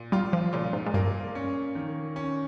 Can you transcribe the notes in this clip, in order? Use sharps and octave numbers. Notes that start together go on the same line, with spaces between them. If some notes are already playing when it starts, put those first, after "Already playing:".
Already playing: A#2
G3 F4
F3
A#2 C#3
G#2
G#2
G2 A#3
C#4
D#3
C#4